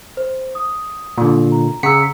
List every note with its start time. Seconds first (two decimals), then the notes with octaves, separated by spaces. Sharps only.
0.17 C5
0.55 D#6
1.18 A#2 D3
1.52 A#5
1.83 C#3 F#5 A#5 E6 B6 C#7